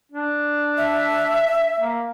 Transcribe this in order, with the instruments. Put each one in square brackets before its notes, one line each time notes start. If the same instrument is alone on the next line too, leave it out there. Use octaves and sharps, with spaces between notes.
[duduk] D4
[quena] E5
[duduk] A#3